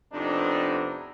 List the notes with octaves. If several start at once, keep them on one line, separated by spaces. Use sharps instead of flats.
F2 C3 B3 D4 D#4